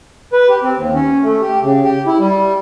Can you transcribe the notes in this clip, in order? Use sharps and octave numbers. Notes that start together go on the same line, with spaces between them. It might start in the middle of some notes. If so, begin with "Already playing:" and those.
B4
G4
C4
D#2
C#4
A3
G4
C#3
G4
E4
G3